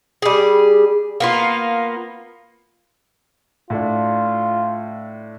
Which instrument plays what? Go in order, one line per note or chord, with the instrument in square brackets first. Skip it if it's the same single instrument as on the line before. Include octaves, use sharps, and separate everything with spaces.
[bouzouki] G3 G#4
A#3 B3 F4
[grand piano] A2 A3 D4 [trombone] F4